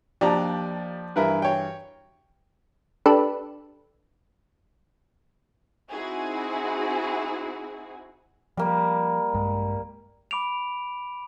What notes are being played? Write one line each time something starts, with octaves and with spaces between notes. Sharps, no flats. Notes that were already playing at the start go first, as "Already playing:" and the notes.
D#2 F3 D4 G4 D5 A#5
G2 E3 E4 A#4 B4
C#5 G5
D4 G4 A4 B4
C4 D#4 E4 F#4 G#4
F3 G3 A#3
A#1 G2 G#3
B5 D6 D7 F7